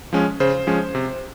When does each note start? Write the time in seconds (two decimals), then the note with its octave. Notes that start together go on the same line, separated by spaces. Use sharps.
0.13 F3 G#3 C#4
0.40 C#3 C5
0.67 F3 G#3 C#4
0.95 C3